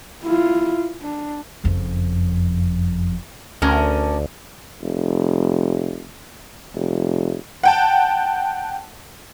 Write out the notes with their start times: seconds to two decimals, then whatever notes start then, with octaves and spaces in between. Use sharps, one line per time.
0.23 E4 F4
1.02 D4
1.64 F#1 F2
3.62 D2 D3 C#4 A#4
4.83 F1
6.75 F1
7.63 F#5 G5 A5